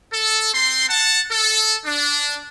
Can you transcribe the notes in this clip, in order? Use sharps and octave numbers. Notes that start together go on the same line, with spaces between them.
A4
C4 C6
F#5 A5
A4
D4